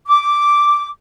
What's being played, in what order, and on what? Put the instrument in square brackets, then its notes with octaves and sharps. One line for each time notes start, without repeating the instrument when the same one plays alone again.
[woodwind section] D6